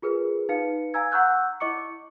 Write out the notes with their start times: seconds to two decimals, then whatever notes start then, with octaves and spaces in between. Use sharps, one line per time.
0.02 F4 G#4 A#4 B4
0.49 D#4 B4 F5 C#7
0.94 F5 G#5 A#5 E6 G#6
1.12 F#5 A#5 C#6 E6 F#6 G6
1.60 E4 D#5 C#6 D6 C#7